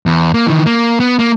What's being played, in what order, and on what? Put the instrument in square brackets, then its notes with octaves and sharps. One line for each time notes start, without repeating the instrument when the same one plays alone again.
[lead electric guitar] E2
A#3
D#3 E3
A#3
B3
A#3